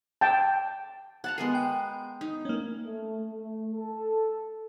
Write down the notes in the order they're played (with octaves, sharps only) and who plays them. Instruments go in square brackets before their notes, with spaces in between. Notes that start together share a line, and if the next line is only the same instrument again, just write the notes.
[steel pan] G5 A5
[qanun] F#5 A5 A#5
[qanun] G#3 B3 A#4 [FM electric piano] C7
[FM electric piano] G5
[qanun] D#4
[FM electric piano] A#3 C#4
[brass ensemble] A3
A3
A4